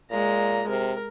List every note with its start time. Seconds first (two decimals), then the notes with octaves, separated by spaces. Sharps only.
0.11 A#2 G#3 A#5
0.68 C3 A#4